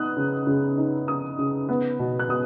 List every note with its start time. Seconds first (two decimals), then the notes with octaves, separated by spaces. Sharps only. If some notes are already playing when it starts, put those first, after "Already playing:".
Already playing: B3 D#4 D#6 F#6
0.17 C#3
0.47 C#3
0.78 D#4
1.08 C#3 D#6
1.38 C#3
1.69 B3
1.99 B2
2.19 F#6
2.29 B2 D#6